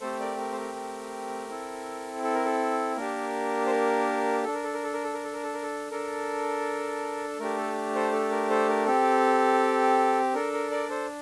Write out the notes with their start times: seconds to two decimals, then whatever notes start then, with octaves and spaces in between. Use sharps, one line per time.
0.01 A3 C4 G4 A4 C5
0.20 A#4 D5
0.38 A#4
0.52 C5
0.57 A#4
0.75 A#4
1.49 C4 E4 A4
2.23 A4
2.34 A#4
2.45 A4
2.96 A#3 D4 G4 A#4
3.66 C5
3.70 A#4
4.44 D4 A4
4.54 A#4
4.64 A4
4.74 A#4
4.83 A4
4.93 A#4
5.04 A4
5.13 A#4
5.24 A4
5.33 A#4
5.43 A4
5.54 A#4
5.63 A4
5.91 D4 A4 A#4
7.39 A3 D4 G4 A#4
7.57 A4
7.95 A4 C5
8.12 A4
8.31 A#4
8.50 A4 C5
8.69 A#4
8.86 C4 G4 A4
10.34 D4 A4 A#4
10.53 A#4
10.71 A#4 D5
10.89 A4 C5